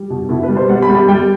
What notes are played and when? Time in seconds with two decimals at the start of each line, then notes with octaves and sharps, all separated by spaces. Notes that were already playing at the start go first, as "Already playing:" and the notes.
Already playing: G3
0.10 B2
0.29 B2 E4
0.43 B4
0.49 G3
0.56 C5
0.69 G3 F#5
0.82 B5
0.89 G3
0.95 B5
1.08 G3 G5